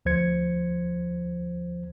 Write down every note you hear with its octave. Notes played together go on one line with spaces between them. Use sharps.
D2 F3 C5 G#6 C#7